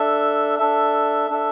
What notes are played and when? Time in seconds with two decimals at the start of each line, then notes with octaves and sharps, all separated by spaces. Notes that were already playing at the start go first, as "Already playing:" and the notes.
Already playing: D4 A4 E5
0.59 D4 A4 E5
1.30 D4 A4 E5